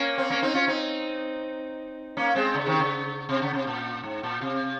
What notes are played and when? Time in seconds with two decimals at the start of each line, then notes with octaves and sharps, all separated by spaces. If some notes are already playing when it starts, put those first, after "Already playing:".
Already playing: A#3 C#4
0.18 C4
0.30 A#3 C#4
0.42 C4 D#4
0.54 C#4 F4
0.67 C4 D#4
2.17 A#3 C#4
2.35 G#3 C4
2.54 C#3
2.66 C3 D#3
2.80 C#3
3.29 C3
3.42 C#3
3.53 C3
3.67 A#2
4.03 G#2
4.23 A#2
4.41 C3